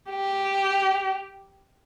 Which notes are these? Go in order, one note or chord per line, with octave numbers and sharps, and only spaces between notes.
G4